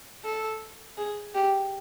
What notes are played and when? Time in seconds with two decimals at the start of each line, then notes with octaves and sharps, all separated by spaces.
0.24 A4
0.97 G#4
1.34 G4